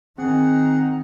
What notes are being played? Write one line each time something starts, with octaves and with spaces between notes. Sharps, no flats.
D#3 C4 D#4 G#4 F#5